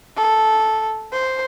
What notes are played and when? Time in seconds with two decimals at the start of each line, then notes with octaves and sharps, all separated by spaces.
0.17 A4
1.13 C5